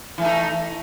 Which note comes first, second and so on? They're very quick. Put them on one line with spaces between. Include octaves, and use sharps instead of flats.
E3 A3 D#4